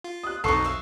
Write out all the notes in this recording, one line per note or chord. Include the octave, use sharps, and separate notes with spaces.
F4
D#6 F#6
B1 F2 D#4 A4 C#6 C7
E5 F5